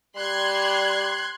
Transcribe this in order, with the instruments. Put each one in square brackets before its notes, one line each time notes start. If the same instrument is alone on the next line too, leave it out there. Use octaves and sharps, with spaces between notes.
[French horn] G3 [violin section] C6 F#6 G#6